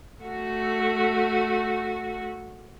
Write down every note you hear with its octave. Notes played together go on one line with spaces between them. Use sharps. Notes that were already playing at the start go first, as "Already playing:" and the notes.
A3 F#4